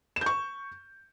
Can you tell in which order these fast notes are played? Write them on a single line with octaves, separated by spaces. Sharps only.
E7 G6 C#6